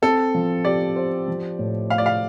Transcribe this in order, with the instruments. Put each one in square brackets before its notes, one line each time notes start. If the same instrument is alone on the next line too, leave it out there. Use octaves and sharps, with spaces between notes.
[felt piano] C4 [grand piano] A4
[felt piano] F3
[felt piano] G4 [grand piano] D5
[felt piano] C5
F3
A2
[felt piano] A3 [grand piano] F5
[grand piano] D5
F5